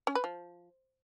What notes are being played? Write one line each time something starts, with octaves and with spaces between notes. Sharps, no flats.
C#4
B4
F3